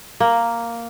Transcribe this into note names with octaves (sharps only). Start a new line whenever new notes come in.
A#3